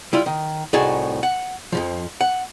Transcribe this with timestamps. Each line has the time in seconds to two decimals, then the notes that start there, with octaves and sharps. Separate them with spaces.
0.13 G3 E4 F4
0.26 D#3
0.73 C2 A2 D#4 F#4 G#4 A5
1.23 F#5
1.72 F2 A2 F3
2.21 F#5